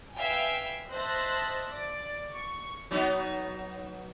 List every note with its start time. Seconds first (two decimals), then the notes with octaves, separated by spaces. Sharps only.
0.15 B4 E5 F5 G5 G#5
0.90 C5 D#5 E5 A5 F#6 A#6
1.70 D5
2.35 C#6
2.91 F#3 B3 D#4